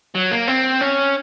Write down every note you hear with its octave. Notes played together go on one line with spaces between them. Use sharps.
F#3
A#3
C4
C#4